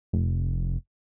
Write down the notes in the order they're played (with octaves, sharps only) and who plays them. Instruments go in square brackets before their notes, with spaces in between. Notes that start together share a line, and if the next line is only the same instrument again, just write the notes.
[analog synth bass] F1